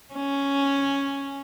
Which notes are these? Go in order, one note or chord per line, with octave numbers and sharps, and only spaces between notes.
C#4